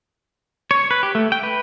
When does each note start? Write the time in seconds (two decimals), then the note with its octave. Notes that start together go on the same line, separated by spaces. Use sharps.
0.71 C#5
0.91 B4
1.03 G4
1.15 A3
1.32 G5
1.43 B4